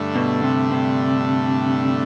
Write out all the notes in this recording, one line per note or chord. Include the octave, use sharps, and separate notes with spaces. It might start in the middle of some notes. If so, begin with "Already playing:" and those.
Already playing: G2 D3 A3
B2
C3
C3